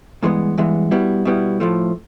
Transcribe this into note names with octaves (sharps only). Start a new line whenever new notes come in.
G2 E3 G#3 B3
G2 E3 G#3 B3
B2 G3 B3 E4
B2 G3 B3 E4
A2 F3 A3